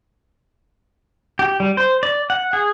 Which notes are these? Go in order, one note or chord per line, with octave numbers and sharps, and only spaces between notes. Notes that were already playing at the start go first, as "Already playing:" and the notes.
G4
G3
C5
D5
F#5
G#4